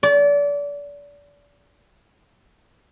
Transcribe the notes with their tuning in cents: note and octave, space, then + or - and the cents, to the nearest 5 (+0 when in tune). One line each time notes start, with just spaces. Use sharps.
D5 -30